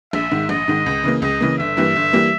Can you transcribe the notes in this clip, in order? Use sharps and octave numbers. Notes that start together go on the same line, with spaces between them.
A#1 E5
G#2 D#3
A#1 D#5
G#2 D#3
C#2
C#3 E3 A#3
C#2 D#5
C#3 E3 A#3
G1 E5
G2 E3 G3 A#3
G1
E3 G3 A#3